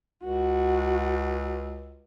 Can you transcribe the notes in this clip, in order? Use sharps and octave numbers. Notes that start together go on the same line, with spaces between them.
C#2 F#4